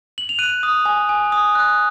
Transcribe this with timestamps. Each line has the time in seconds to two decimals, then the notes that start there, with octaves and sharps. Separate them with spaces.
0.18 F#7
0.29 F7
0.39 F#6 D#7
0.63 D#6
0.86 G#5
1.09 G#5
1.32 D#6
1.55 F#6